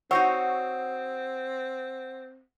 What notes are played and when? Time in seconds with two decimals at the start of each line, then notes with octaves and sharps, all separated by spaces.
0.11 C4 D#4 F#4 C#5 F#5 E6